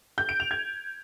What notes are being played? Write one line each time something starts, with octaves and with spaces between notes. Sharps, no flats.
G6
D7
F7
G#6